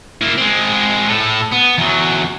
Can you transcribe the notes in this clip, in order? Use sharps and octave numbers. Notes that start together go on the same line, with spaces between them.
A#3 E4
G#3 C4
A2 A4
B3
E2 F#3